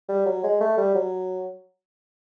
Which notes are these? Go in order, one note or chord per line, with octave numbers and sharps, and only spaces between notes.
G3
F#3
G#3
A3
G3
F#3